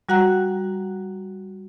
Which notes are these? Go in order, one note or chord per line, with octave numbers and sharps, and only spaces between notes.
G3 F#4 F#5 A#5 F#6